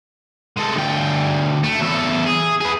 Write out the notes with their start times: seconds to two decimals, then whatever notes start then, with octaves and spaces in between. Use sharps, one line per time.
0.57 G#3 A4
0.75 D2 G5
1.64 A3
1.81 E2 A4
2.26 G#4
2.61 G#4 B4